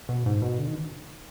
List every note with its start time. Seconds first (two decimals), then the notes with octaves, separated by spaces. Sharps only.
0.09 B2
0.26 G#2
0.42 B2
0.58 D3
0.67 D#3